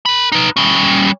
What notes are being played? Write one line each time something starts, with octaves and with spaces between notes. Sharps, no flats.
A#4 B5
D#4 B4
G3 C#4